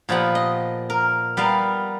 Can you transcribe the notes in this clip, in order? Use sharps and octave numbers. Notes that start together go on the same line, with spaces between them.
A#2 F3 B3 G4 F#5
D#5
A#4
G3 B3 A#4 F5